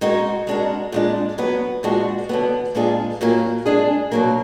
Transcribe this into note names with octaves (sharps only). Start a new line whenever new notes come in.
G#3 D#4 F#4 A#4
G#3 D4 F#4 A#4
A#2 G#3 D4
F#3 B3 D4
A#2 G#3 D4 F#4
D3 F#3 B3
A#2 G#3 D4 F4 G#4
A#2 F#3 A#3
G#3 D4 G#4
B2 F#3 A#3